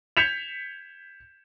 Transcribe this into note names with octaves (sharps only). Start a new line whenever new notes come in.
G6 G#6 B6 C#7 E7 F7